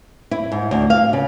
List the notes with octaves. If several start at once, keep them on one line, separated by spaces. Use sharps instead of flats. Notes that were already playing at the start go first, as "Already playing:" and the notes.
E4
G#2
D2
F5
C#3